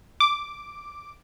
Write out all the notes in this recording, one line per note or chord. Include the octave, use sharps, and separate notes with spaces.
D6